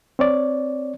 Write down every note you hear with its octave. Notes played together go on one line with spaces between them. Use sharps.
C4 C#5 D5